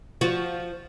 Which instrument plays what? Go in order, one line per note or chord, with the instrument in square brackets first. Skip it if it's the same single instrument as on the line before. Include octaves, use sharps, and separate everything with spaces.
[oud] F3 F#4